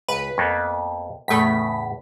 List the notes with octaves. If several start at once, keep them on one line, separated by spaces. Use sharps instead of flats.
C#2 B4
F2 A#3 B3
E2 A2 C#3 A3 B6